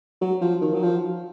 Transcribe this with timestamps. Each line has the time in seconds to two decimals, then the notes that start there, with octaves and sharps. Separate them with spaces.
0.21 F#3
0.41 F3
0.61 D#3
0.73 F#3
0.83 F3